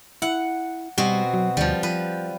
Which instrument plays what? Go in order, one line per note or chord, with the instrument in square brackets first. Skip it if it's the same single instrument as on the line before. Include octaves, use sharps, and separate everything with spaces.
[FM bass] E4 [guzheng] F#5
[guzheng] B2 C4 F#4 [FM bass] G3
[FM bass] F#3
[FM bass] D2 [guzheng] F3 G3
[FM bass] F3 [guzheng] B4